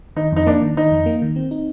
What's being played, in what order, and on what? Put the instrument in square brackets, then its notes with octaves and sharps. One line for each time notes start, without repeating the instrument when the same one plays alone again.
[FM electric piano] D#3 [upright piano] D#4
[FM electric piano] F2 [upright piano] D#4
[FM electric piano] A#3 [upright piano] D4
[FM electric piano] D#3
[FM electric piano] D#3 [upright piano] D#4
[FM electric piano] F2
A#3
D#3
C4
D#4